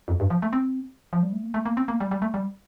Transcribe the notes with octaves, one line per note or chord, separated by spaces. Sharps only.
F2
G2
F3
A3
C4
F3
G3
A3
A#3
A3
A#3
C4
A#3
G3
G3
A3
G3